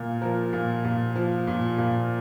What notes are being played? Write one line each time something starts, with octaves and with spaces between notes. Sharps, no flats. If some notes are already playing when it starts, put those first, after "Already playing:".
Already playing: A#2
F3 A#4
A#2
A#2
F3
A#2
A#2